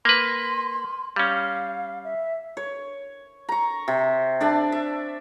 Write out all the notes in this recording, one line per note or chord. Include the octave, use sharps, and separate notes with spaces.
A#3 B4 C6
G3 C#4 F5
E5
C#5
A#5 C#6
C3
D4 D5 E5 A5
E5